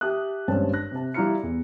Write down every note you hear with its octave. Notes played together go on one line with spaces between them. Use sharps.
G4 E5 A5 D#6 F#6
G#1 G2 A#3 C#4 C5 A5
F#6 A#6
C3 A5
G3 E4 F4 A#5 F6 C#7
E2